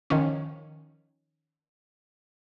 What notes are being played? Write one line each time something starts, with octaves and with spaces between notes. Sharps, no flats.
D#3 F3 C#4